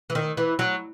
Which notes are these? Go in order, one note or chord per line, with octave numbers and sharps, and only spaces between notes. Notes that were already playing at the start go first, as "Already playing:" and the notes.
E3
D#3
E3
F#3